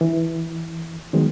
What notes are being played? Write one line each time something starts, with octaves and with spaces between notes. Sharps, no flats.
E3 E4
D#3 F#3 G#3 B3